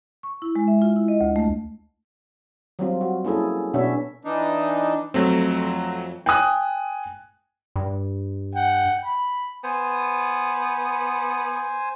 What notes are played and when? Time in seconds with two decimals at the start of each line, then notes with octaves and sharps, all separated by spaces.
0.23 C#6
0.42 E4
0.55 G#3
0.68 E5
0.82 F4
0.96 E4
1.08 D#5
1.21 D2
1.36 A3
2.79 F#3 G3 C4 F4
3.01 F#4
3.25 A#3 C#4 E4 G#4 A4
3.74 B2 B3 C#4 D4 C#5 E5
4.25 E3 D4 D#4
5.14 F2 F#3 A3 C4
6.26 G5 G#5 D#6 F#6
7.76 G2
8.55 F#5 G5
9.05 B5
9.64 B3 C5 G#5